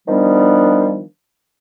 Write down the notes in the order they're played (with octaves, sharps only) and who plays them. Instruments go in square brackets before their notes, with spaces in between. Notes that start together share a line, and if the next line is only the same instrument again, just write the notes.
[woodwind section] D#3 F3 G3 B3 D4